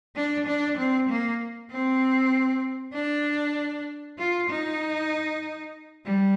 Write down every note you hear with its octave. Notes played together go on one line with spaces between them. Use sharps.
D4
D4
C4
A#3
C4
D4
F4
D#4
G3